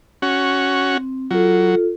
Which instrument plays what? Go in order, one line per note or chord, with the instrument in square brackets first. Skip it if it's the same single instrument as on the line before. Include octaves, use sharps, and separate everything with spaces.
[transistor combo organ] C#4 F#4
[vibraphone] C4
[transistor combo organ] F#3 [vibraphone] F4 A4